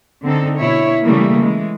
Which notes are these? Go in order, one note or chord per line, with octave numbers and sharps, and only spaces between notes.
D3 C4 D#4 A4
B2 E4 C#5
C#3 E3 G3 A3 A#3
E3 G#3